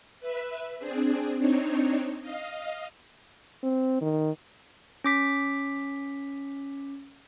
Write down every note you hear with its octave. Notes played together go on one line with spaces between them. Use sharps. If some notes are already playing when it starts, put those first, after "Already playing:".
B4 E5
C4 D4 G#4
C4 D4 D#4 C#5
D#5 F5
C4
D#3
C#4 D6 B6